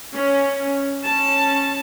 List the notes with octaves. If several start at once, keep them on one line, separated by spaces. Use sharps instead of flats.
C#4
C#4 A5